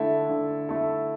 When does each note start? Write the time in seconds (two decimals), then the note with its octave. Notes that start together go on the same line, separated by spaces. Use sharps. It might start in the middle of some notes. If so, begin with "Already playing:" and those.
Already playing: D3 A3 E4 A4
0.29 D3
0.69 A3 E4 A4